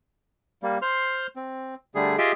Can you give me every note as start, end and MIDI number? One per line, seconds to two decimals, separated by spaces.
0.63 0.78 55
0.63 0.78 58
0.82 1.27 72
0.82 1.27 84
0.82 1.27 89
1.36 1.75 60
1.95 2.16 50
1.95 2.16 55
1.95 2.16 57
1.95 2.16 68
2.18 2.32 65
2.18 2.32 67
2.18 2.32 68
2.18 2.32 75
2.18 2.32 76
2.18 2.32 79